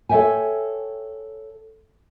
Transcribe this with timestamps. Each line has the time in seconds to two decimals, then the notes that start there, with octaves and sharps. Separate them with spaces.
0.09 A4 C#5 D5 E5 G5 G#5